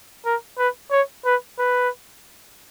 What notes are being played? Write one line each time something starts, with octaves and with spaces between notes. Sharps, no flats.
A#4
B4
C#5
B4
B4